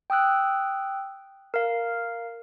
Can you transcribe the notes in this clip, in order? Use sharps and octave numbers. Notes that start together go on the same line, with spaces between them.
G5 D#6 E6 F#6
A#4 F5